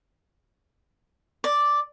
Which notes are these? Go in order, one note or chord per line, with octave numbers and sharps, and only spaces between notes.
D5